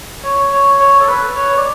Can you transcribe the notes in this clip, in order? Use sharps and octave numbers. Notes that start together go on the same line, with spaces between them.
C#5
C#5
C#5
A4
B4
C#5
D5